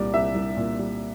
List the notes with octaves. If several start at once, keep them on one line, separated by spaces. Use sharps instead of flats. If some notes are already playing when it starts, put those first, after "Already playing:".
Already playing: C2 A#2 G3 D5
C2 E5
C2
A#2
G3